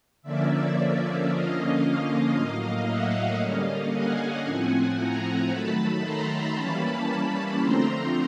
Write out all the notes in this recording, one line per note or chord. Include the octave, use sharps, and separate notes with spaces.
D3 F3 A#3 C#4 D5 E5
D3 F3 A#3 C#4 D#5 F5
A2 F#3 A#3
E5 F#5
D3 G3 A#3 C#4 D#5 F5
F#5 G#5
A2 F3 A3 C4
G#5 A#5
D#3 F#3 A3 A5 B5
A#5 C6
E3 G3 A#3 C#4 A5 B5
D3 F3 A3 C4 A#5 C6